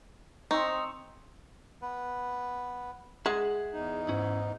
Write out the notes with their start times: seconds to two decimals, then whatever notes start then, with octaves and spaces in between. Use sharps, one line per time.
0.51 C4 D#4 C5 C#6
1.82 B3 B4
3.26 G#3 G#4 E5 F#5
3.73 E2 D#4
4.09 G#2 C#4 E4